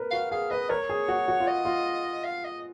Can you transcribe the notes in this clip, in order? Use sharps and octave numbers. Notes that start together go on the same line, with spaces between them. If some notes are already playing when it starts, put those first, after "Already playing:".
Already playing: A#4 B4
F#4 F5
G#4 F5
B4 D#5
A#4 C#5
G#4
F#4
F#4
F4
D#5
F4
F5
D#5